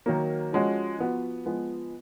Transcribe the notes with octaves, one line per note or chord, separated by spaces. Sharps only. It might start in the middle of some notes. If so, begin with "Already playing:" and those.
D#3 F#3 A#3
F3 G#3 C#4 F#4
F3 B3 F#4
F3 G#3 B3